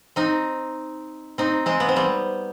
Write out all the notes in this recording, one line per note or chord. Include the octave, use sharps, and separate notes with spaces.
C4 D#4
C4 D#4
G#3 C4
B3
C4
G3 B3